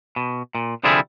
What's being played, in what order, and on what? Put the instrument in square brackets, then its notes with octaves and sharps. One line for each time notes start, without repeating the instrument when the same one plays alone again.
[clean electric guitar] B2
A#2
C2 D3 F3 G3 E4 G#4